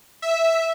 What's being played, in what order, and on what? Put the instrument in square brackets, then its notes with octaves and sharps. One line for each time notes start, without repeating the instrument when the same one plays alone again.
[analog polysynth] E5